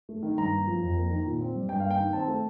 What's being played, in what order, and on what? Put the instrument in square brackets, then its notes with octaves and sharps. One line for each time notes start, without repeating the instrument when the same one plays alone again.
[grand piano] A3
D#3
G2 A#5
A#3
F3
F2
A#3
D#3
A#2
C4
G3
G2 G5
A#3 F5
G5
D#3
C4 A5
A3